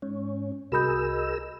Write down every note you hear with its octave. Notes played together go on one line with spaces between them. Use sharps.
G#2 C#4
C2 F#4 G#4 A#4 D#5 B5 E6 G6